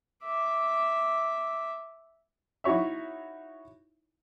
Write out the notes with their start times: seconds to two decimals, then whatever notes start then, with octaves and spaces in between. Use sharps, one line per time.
0.24 E5 D6
2.64 D#4 E4 F#4 C#5 E5